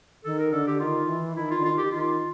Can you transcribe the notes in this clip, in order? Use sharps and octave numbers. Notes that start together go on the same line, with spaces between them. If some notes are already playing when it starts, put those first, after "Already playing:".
D#3 A4
A#4
D3 A4
G4
D#3 F4
E3
D#3 E4
F4
D3
D#3 F4
G4
D#3 F4